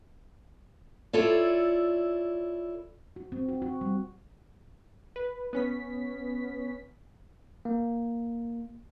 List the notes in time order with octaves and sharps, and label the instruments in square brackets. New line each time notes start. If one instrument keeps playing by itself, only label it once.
[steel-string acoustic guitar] E4 F4 A4 C#5 D5
[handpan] F#4
C4
F#4
F#4
G3
[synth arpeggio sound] B4
B3 C#4 B6
[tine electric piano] A#3